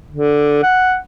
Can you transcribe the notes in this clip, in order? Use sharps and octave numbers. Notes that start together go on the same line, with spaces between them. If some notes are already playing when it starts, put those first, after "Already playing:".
D3
F#5